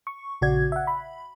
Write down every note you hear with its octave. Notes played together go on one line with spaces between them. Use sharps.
C#6
A#1 C#3 F#4 D5 G#6
E5 F#5
B5